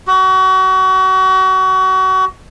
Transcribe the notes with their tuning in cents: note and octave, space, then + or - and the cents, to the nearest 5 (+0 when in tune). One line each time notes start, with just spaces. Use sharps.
F#4 +30